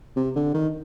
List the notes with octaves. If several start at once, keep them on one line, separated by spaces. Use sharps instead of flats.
C3
D3
D#3